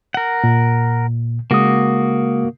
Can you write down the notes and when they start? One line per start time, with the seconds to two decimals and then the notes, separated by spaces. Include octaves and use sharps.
0.14 A#4 F#5
0.44 A#2
1.51 C#3 G#3 A#3 F#4 D#6